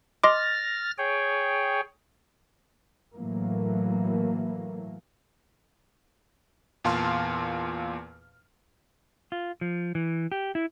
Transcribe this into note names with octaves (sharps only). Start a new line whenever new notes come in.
D#5 C6 D6 F6 A6 A#6
G#4 C#5 G5
A2 E3 F#3 A3 A#3
E2 A#2 F5 A5 C6 F6
F4
F3
E3
G4
E4